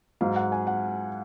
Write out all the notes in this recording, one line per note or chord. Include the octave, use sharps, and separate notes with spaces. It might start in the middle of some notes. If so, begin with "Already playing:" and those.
G#2 F#3 F5
F#5
G#5
F#5